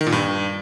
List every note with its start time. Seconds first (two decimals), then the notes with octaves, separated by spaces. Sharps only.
0.01 D#3
0.07 A#2
0.12 G2